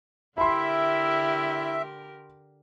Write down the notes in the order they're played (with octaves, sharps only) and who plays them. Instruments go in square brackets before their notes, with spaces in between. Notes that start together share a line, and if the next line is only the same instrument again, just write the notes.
[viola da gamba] D3 G4 A#4 [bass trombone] E4 [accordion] E5 [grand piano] B5 C6